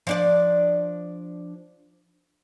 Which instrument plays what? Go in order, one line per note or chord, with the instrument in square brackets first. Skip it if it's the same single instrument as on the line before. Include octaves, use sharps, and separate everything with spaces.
[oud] F3 D4 D5